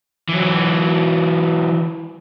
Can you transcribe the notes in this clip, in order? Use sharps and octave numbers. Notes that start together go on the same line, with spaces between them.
E3 F#3